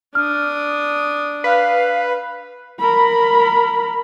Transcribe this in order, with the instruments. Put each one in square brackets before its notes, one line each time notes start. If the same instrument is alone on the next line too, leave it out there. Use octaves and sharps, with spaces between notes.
[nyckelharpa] D4 D#6 [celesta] F6
[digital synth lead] B4 [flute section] F5
[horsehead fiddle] A#4 B5